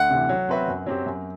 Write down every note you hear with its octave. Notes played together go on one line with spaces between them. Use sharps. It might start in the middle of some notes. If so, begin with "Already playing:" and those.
Already playing: D2 F#5
C3 E3
F#3
C4 F#4 B4 E5
F#2
F#3 C4 G4
F#2